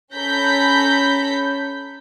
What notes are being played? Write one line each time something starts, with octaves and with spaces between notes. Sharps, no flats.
C#4 A4 A#5 B5 G6 B6